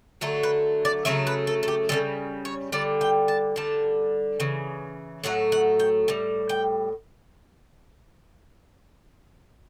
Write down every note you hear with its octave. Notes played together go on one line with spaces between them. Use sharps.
D3 F#3 A3 A4
B4
D5
C#3 F#3 A3 E5
B4
A4
A4
G4
C#3 E3 G3 A4
C#5
D3 G3 D5
G5
A5
D3 G3 A5
C#3 E3
A2 F#3 A3 F#5
F#5
G5
A2 G3
G5